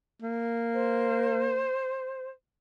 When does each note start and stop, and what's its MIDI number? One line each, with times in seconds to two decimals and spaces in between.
0.22 1.69 58
0.74 2.30 72